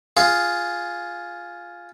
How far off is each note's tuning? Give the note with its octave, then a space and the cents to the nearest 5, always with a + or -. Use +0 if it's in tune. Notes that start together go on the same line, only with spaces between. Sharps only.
F4 +0 G#4 +0